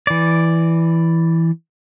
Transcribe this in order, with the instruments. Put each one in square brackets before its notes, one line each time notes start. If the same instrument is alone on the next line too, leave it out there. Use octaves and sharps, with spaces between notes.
[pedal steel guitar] E3 D5